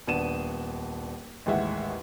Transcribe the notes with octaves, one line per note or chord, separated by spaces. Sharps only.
D#1 B3 D4 D#7 E7
A1 D#2 G#3 E5 F#5